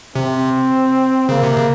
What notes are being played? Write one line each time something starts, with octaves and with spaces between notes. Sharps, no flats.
C3 C4
C#3 A#3
C3
C#3